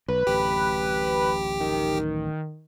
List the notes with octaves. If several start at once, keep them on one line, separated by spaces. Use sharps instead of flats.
B1 B4
D1 A1 G4
D#3